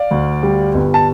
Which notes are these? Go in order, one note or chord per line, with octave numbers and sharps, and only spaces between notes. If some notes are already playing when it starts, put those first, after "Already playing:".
Already playing: D5 F5
D2
G3
G1
A5